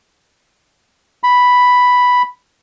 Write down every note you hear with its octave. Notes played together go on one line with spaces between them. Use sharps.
B5